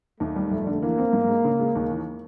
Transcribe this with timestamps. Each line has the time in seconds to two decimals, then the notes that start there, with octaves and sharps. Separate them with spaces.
0.20 D#2 A3
0.36 G3
0.51 F1 A3
0.67 D3
0.82 E3 A#3
0.98 C4
1.13 G#2
1.29 G#3
1.44 C#3
1.59 G#3
1.75 D#2
1.90 E3